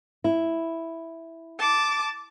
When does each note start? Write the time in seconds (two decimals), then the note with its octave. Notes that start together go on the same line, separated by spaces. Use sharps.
0.24 E4
1.59 A5 D6